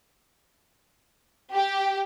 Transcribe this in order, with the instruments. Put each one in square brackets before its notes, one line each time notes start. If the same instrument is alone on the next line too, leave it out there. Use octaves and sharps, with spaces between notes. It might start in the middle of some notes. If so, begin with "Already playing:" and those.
[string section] G4